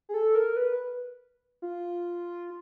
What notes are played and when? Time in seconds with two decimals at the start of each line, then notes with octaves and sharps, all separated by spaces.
0.09 G#4
0.14 A4
0.35 A#4
0.57 B4
1.62 F4